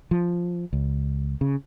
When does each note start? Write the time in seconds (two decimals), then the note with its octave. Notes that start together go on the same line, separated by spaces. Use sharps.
0.11 F3
0.73 C#2
1.41 C#3